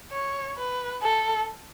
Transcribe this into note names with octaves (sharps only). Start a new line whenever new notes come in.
C#5
B4
A4